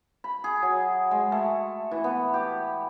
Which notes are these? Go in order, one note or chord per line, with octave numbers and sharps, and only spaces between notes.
B5
G#4
F#3
G#3
A3
E3
B3
G4